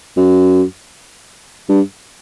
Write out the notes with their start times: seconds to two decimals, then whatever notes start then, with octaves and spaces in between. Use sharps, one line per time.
0.17 F#2
1.69 G2